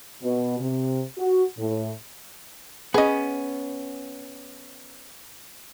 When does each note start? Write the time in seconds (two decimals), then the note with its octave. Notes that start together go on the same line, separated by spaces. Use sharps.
0.23 B2
0.59 C3
1.17 F#4
1.58 A2
2.94 B3 C#4 G#4 D#5